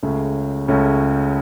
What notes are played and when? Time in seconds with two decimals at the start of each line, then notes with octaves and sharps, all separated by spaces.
0.03 C#2 C#3 A3 C#4
0.68 C#2 C#3 A3 C#4